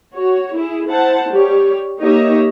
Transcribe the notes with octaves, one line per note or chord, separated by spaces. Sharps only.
F#4 C#5
E4 G#4
E4 C5 F#5 A5
G3 G4 C#5
A#3 D#4 G4 C#5 D#5 E5